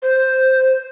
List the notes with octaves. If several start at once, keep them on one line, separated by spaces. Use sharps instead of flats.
C5